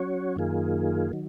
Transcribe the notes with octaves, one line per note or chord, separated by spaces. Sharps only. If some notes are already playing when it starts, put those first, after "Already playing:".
Already playing: F#3 C#4 F#4 C#5
F#2 D#3 A#3 F4 G#4
D#3 F#3